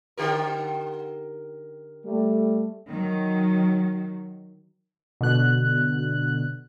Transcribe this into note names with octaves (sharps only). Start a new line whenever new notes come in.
D3 G4 A#4
G3 A3
D#3 F#3
B2 D3 F#6